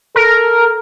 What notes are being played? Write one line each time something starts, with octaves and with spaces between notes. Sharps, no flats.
A4 A#4